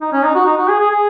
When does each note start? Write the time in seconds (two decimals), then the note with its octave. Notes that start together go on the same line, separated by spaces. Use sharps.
0.01 D#4
0.13 C#4
0.24 D#4
0.35 F#4
0.46 D#4
0.57 F#4
0.69 G#4
0.80 G#4
0.91 G#4